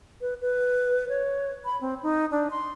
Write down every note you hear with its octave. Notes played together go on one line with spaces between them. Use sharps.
B4
B4
C#5
B5
C4
D#4
D4
C6